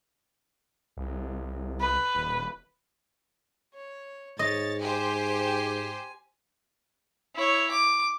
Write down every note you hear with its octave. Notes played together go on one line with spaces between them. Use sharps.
C2
B4
D#1
C#5
G#2 C#5 D#5 A6
G4 C5 G#5
E4 C#5
D6